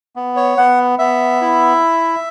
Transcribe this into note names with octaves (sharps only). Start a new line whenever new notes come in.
B3
C#5
B3 F#5
B3 E5
E4